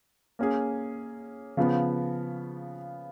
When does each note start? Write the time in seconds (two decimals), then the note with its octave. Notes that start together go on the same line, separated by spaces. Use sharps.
0.39 A#3 C#4 G#4
1.57 C#3 F3 B3